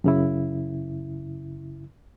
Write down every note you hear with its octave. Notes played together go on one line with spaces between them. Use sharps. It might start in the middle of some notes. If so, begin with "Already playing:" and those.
F#2 C#3 E4